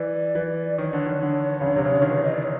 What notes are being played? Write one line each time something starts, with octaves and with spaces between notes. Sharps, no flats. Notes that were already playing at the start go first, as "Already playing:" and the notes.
Already playing: E3 D5
E3
D#3 C#5
D3
D#3
D3
C#3
D3
C3
C#3
D3
D#3
E3
D#5
D5
C#5